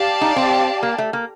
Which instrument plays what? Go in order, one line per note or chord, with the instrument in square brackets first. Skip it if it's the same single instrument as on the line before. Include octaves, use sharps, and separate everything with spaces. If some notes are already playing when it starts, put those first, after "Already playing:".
Already playing: [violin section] G4 D5 F5 A5
[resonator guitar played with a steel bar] D#4
C4
A#3
A3
A#3